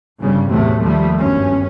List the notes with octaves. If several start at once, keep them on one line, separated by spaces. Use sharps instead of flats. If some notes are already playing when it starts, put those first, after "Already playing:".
G1 C#3 G3
E2 A2 C3 F#3 A3
D#2 F3 G3 A3 A#3
G1 F#2 C#4